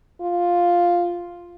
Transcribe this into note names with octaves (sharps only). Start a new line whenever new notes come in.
F4